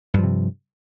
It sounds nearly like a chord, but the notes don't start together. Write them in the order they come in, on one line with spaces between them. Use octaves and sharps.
G2 F3 C3